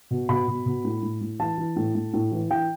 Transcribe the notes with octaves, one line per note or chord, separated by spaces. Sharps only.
B2
B2 B5
B2
B2
A2
A2
A2
E3 A5
E3
A2
A2
A2
E3
E3 G5